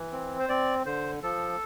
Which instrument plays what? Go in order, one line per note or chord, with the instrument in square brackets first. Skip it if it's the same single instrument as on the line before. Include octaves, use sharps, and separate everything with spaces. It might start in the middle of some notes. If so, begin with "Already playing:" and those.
Already playing: [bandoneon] E3
C4
C5
C4 D5
D3 C5
F3 A4